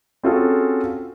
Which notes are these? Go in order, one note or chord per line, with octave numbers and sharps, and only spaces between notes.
C4 C#4 F4 F#4 G#4 A4